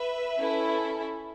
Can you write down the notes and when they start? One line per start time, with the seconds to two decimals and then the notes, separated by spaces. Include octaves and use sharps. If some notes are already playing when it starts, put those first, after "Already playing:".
Already playing: B4 E5
0.39 C#4 E4 A4